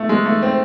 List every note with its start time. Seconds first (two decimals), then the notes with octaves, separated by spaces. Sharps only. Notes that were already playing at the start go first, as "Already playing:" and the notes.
Already playing: A3
0.09 G#3
0.25 A3
0.42 C4